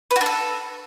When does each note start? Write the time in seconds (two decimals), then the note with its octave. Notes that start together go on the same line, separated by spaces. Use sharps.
0.11 B4
0.16 F#4
0.21 D4
0.26 A4